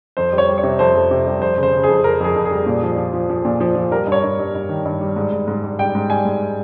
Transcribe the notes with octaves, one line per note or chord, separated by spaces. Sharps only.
F2 C5
G3
C#5
G3
C#5
C3
F2 C5
F2
C3
G3
F2 C5
C#3
C5
C#3
G#4
F2
F2 A#4
F2 G#4
F2
G#4
G3
A#2
F3
F3
F3
F3
A#2
F3
F3
G3 A#4
G2
C#5
G2
G2
G2
D#3
G2
G3
G#2
G#2
G#2
G3
G3 G5
G#2
G3 G#5
G#2